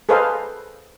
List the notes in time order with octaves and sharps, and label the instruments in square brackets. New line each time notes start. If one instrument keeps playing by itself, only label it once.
[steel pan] G#4 A4 B4 C5 D#5 F5